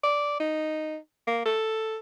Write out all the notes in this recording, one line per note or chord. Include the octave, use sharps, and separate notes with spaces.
D5
D#4
A#3
A4